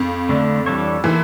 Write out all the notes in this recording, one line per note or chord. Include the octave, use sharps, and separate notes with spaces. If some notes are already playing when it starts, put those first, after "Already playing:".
Already playing: F2
D3 A3 D4
E3 G3 D4 A4 C#5
E3 F3 A#3 E4 A4